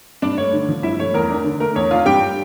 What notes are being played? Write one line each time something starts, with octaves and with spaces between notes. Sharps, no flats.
G2 D4 D5
A3 C#5
D3
F3
G2 E4 E5
A3 C#5
E2 A#4
D4
D3
A3 A#4
E2 C#5
D4 F4 F5
G2 G4 G5